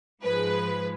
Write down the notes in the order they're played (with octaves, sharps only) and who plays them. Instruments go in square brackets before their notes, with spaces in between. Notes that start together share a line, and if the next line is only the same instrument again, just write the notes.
[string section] G#2 F3 G#3 B4